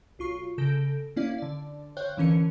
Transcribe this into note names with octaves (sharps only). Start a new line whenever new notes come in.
B1 F4 C#6 C7
C#3 A4 G6 A#6 D7
A#3 C#4 E4 D5 F5
D3 D5
C5 C#5 F5 G5 F#6 G6
D3 E3 C#4 A#4 C#7